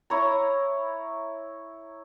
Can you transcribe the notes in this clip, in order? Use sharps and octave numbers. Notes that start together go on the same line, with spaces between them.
E4 C#5 A#5